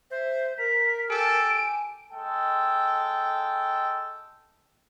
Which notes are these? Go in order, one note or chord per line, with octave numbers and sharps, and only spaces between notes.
C5 E5
A#4 A#5 B6
G4 A4 G#5 D7
G#3 A4 G5